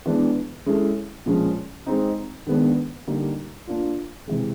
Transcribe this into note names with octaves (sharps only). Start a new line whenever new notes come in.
E3 G#3 B3 D4
G#3 C#4 E4 A4
A#2 F3 G#3 C#4
G#3 C4 D#4
D#3 G#3 B3 D4
D3 G3 A#3 D#4
A#3 D4 F4
C3 E3 G#3